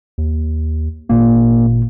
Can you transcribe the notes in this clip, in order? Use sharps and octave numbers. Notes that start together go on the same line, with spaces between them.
D#2
G#1 A#2 A#3